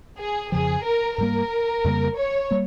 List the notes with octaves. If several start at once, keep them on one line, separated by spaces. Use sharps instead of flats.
G#4
F2 C#3 F3 G#4
A#4
G#2 G3 A#3 A#4
F2 C#3 G3 A#3
C#5
G3 A#3